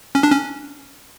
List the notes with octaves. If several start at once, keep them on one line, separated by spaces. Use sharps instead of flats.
C#4
D4
C#4